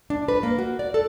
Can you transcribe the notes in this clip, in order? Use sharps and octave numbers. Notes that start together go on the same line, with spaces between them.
D4
B4
A#3
F#4
D5
A4